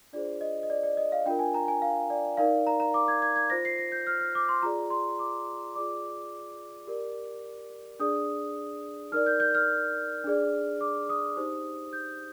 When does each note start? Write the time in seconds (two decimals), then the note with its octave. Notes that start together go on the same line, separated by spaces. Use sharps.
0.13 D4 F4 G#4 C5 D5
0.41 D#5
0.63 D#5
0.70 D5
0.83 D5
0.97 D#5
1.12 F5
1.26 D4 F4 A#4 G5
1.39 G#5
1.54 A#5
1.68 G#5
1.82 F5
2.10 D5
2.37 D#4 A#4 D5 F5
2.67 A#5
2.80 A#5
2.94 D6
3.08 G#6
3.22 G#6
3.36 G#6
3.50 F4 C5 A#6
3.65 C7
3.79 A#6
3.92 G6
4.07 F6
4.21 F6
4.35 D6
4.49 C6
4.63 F4 G#4 D5 A#5
4.90 C6
5.19 D6
5.75 F4 G#4 D5 D6
6.87 G4 A#4 D5
8.00 D4 G#4 D5 D#6
9.12 D#4 A#4 D5 F6
9.26 G6
9.40 G6
9.55 F6
10.24 D4 G#4 D5
10.81 D6
11.09 D#6
11.36 D#4 G4 C5
11.93 G6